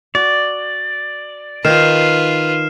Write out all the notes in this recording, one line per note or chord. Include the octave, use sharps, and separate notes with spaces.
F#4 D5
D#3 F4 B4 F6 C7 E7